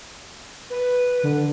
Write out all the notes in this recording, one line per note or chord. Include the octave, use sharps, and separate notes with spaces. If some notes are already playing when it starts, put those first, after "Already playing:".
B4
D3